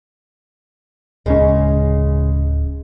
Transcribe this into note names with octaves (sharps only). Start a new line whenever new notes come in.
D1 C#3 G#3 C#4